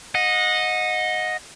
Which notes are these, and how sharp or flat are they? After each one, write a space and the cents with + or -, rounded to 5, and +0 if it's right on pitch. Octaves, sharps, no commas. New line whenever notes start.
D#5 +0 F#5 -30